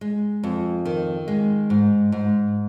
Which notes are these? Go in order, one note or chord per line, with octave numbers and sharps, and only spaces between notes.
G#3
F2
D#3
G#3
G#2
G#2